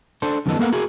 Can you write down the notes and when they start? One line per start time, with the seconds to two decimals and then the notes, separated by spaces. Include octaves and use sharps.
0.22 D4 A4 C5
0.46 F#2 D#3 F3 B3 A4 D#5
0.59 A#3 B3 A4 A#4 F5 F#5
0.72 E4 F#4 G#4 A#4